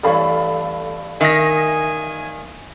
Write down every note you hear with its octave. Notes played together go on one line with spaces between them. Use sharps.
A1 G2 A4 C#5 F5 B5
D#3 E5 G#5 D#6 A#6